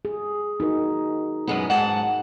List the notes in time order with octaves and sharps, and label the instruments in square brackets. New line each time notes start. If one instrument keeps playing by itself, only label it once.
[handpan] G#4
D#4 F#4 A#4
[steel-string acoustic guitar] F#2 G#3 B3
G#2 F#5 A5